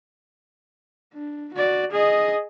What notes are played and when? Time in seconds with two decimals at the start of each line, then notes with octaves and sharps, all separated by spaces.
1.14 D4
1.54 F#4 D5
1.92 G#4 D#5